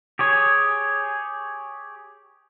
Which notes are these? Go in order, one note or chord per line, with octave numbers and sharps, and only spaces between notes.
G4 G#4 C#5